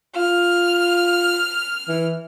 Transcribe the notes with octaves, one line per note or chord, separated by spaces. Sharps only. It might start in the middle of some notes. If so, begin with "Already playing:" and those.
F4 F6
E3